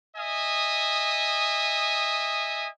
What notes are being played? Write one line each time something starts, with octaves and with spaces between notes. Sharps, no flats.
D#5 E5 G#5 D#6